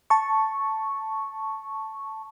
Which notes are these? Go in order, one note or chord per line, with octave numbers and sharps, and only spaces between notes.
A5 C#6